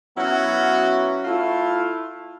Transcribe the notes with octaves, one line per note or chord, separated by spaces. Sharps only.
F#3 B3 C#4 E4 F#4
A3 E4 F4